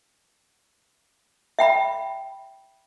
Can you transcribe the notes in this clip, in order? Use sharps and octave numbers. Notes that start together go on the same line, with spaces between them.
E5 G5 B5